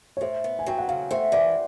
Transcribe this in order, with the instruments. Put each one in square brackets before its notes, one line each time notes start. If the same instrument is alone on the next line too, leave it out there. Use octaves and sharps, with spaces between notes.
[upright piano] C#5
[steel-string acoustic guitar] A2 [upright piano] C5
[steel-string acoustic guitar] B3
[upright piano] G#5
[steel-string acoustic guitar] F#3 [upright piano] G5
[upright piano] F#5
[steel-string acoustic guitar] C#3 [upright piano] F5
[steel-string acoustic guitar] A3 [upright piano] C5
[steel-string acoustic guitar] E3 [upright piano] D5